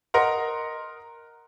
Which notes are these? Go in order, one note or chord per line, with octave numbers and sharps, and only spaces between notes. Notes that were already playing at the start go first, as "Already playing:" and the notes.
A#4 D#5 F#5 A#5 C6